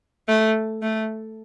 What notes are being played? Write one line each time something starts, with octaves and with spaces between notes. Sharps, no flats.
A3
A3